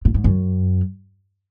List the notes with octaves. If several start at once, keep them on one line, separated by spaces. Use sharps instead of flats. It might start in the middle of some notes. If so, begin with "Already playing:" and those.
A#2
G#2
F#2